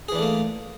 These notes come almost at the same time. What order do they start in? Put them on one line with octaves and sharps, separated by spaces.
G#4 E3 D4 A3 A#3